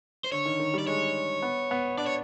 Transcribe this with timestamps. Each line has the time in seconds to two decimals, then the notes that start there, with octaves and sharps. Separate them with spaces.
0.24 C5
0.32 D3 C#5
0.46 D#3
0.60 D#3
0.74 G3
0.78 D5
0.87 G#3 C#5
1.42 B3
1.71 B3
1.98 D4 D5
2.06 C#5